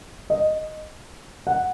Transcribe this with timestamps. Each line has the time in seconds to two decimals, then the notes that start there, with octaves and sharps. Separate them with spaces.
0.30 D#5
1.47 F#5